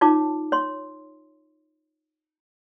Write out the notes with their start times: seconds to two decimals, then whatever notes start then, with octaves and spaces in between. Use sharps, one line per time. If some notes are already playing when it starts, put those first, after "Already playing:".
0.01 D#4 F4 C#5 A5 D6
0.52 C#5 C6